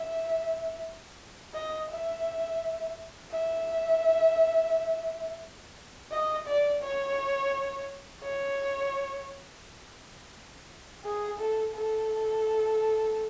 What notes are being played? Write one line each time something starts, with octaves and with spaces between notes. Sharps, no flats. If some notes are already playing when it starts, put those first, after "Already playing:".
Already playing: E5
D#5
E5
E5
D#5
D5
C#5
C#5
G#4
A4
A4